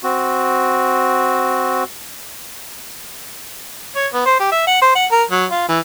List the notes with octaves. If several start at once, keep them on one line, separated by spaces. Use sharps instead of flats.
C4 F#4
C#5
B3
C5
G4
E5
F#5
C5
F#5
A#4
F#3
F4
E3